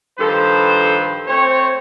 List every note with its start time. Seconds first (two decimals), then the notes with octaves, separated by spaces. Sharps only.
0.19 G2 D#3 F3 A4 B4 C5
1.27 A3 C4 C5 C#5